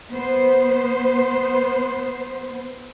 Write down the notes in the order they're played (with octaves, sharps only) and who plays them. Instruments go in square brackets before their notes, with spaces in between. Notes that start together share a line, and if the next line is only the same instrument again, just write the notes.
[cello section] B3 C5